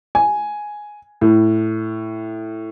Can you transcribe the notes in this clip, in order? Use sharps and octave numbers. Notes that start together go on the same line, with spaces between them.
G#5
A2